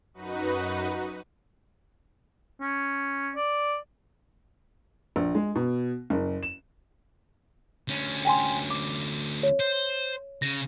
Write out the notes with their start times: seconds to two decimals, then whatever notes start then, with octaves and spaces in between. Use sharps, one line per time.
0.14 F#2 D#4 F#4 B4 D#7
2.61 C#4
3.36 D5
5.16 A#1
5.35 G#3
5.55 B2
6.10 F#1
6.43 E7
7.88 D2 C#4
8.25 G5 G#5 C6
8.70 D6
9.43 C#5
9.60 C5
10.42 C#3 A#6